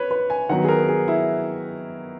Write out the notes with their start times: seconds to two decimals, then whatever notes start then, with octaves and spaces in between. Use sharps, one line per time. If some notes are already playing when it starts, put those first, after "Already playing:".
Already playing: B4 C#5
0.11 B4
0.30 G#5
0.49 D#3 F#3 B3 F#5
0.64 G#4
0.69 A#4
0.89 G#4
1.08 E4